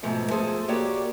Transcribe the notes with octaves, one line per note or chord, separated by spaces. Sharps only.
G#2 B2 F3 A3 C4
F3 A3 G#4 A4 C5
A#3 F#4 G4 C#5 D5